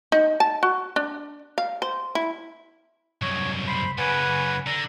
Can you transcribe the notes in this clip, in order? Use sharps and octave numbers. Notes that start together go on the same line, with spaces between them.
D#4
A5
F#4
D4
F5
C5
E4
C2 F#2 C#5
C5 B5
F#2 C#3 B4 F#5 G#5
D3 D5 A#5